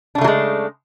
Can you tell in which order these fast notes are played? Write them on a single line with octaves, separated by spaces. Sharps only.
D4 C#3 A3 F#3 G#3